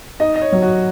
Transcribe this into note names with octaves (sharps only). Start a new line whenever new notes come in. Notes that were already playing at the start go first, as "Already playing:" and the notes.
D#4 D#5
D#5
C#5
F#3
F#4